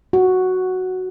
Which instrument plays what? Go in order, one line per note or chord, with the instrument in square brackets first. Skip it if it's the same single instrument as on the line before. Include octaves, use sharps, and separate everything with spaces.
[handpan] F#4